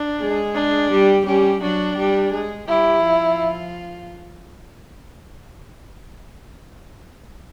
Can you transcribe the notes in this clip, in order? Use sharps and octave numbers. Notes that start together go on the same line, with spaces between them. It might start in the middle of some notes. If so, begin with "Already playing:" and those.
Already playing: D4
G#3 G#4
D4
G3 G4
G3 C#4 G4
F#3 D4 F#4
G3 G4
G#3 G#4
G3 E4 G4
F3 F4